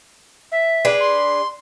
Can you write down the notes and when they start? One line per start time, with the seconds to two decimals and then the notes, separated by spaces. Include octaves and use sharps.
0.52 E5
0.85 D4 G#4 B4
1.00 C6